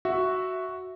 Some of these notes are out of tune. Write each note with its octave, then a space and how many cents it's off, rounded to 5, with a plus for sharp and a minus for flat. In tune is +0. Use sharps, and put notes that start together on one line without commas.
F#4 +0 E5 +0